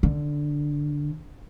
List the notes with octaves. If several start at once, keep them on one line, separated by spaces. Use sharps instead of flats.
D3